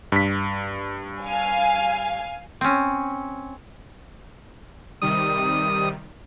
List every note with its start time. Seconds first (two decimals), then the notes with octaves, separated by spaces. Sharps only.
0.12 G2 B6
1.22 F5 G#5
2.61 C4 C#4
5.02 C3 D#3 G3 D#6